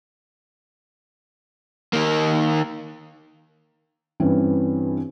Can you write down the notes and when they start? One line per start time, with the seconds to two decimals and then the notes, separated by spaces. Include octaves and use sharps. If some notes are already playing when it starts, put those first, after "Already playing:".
1.93 D#3 A#3
4.20 G2 E3 C4 C#4